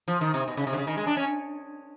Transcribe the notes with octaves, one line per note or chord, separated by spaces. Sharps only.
F3
D#3
C3
B2
C#3
C3
D3
C#3
D#3
G#3
D4
C#4